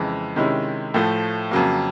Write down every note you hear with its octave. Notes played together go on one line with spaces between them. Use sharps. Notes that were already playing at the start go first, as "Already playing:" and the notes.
Already playing: F2 C#3 E3 G#3
C3 D#3 G#3 C#4 E4
A2 F3 A3
F2 C#3 F#3 A#3